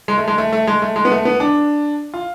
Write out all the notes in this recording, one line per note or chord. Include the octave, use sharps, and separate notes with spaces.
G#3
A3
G#3
A3
A3
G#3
A3
G#3
B3
A3
B3
D4
F4